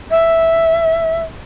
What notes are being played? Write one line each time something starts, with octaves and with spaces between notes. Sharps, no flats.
E5